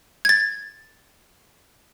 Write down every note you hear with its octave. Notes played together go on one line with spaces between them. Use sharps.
G#6 A6